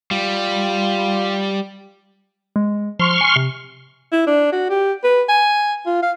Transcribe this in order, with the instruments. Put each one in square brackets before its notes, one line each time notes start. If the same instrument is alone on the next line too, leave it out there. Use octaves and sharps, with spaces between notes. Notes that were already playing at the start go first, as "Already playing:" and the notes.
[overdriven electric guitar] G3 [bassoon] F4
[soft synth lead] G#3
[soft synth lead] F3 [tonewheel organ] C6 C#6 F6
[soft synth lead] G#5
C3
[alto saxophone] E4
D4
F#4
G4
B4
G#5
F4
F5